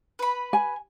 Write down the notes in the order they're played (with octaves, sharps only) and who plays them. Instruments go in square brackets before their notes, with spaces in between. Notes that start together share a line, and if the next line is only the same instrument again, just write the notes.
[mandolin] B4 B5
[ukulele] G#5